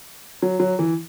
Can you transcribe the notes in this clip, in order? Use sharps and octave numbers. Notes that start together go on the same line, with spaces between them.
F#3
F#3
E3